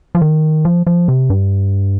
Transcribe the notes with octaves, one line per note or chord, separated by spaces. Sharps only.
F3
D#3
F3
F3
C3
G2